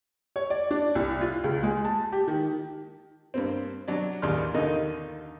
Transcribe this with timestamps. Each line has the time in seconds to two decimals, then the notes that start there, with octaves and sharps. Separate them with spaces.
0.36 C#5
0.50 D5
0.71 D4
0.95 C2
1.21 F4
1.44 C#2
1.63 G#3
1.84 A5
2.12 G4
2.28 D#3
3.34 G2 A#3 C4
3.88 F#3 D4 D5
4.22 A1 D#2 G#4 D5 C6 F6
4.54 D#2 D3 D#3 A#3 D#4 D#5